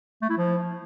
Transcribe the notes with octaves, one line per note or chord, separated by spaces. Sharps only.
A3
E4
F3